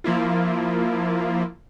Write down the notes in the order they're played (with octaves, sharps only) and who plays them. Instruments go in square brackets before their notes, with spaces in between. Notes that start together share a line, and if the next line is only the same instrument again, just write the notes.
[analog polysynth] F3 A#3 E4 F4